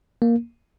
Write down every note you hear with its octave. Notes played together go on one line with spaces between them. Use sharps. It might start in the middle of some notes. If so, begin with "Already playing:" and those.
A#3